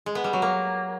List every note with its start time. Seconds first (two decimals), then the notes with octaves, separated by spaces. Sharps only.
0.06 G#3
0.15 B3
0.24 G3
0.33 F#3
0.42 A#3